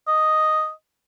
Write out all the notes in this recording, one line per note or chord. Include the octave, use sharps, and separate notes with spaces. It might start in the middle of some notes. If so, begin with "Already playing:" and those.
D#5